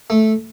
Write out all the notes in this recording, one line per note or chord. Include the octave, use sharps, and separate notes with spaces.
A3